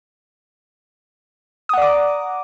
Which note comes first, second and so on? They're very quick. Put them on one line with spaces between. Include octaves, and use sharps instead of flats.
D#6 F#5 D5 D6 A#5